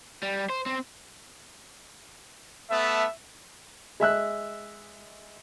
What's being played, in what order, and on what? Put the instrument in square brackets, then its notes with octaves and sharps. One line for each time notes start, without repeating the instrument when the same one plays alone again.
[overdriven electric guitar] G3
C5
C4
[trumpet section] A3 B3 A5 [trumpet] E5
[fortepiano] G#3 E5 E6 F#6